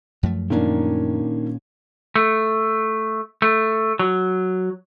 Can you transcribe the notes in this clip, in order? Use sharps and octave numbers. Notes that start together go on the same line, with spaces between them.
F#2 F3 A3
A#2 D#3 A#3 C#4 D4
A3
A3
F#3